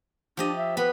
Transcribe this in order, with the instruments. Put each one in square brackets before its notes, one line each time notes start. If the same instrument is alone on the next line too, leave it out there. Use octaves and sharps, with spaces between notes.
[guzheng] F3 G4 D#5 [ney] D4
[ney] E5
[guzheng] B3 B5 [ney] B4